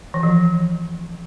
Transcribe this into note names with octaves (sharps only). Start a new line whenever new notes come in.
E3
F3